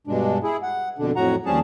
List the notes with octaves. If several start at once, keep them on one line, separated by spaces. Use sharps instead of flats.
G2 B2 G#3 D4
E4 G#4
F#5
F2 B2 D3 D4
F2 A2 F#3 F#4 F#5 A#5
D#2 F3 G3 C#4 G#4 A5